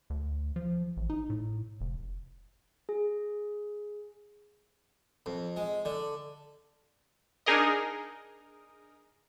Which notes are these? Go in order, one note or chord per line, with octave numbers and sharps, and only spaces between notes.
D2
F3
A1
D#4
A2
F1
G#4
F2
G#3
D3
D4 D#4 G#4 A#4 D#5